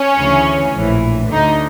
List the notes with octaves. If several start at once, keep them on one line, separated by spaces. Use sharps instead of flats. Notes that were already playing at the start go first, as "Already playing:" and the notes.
Already playing: C#4
D2 C#3 E3
A#1 A2 E3
D2 D3 D#4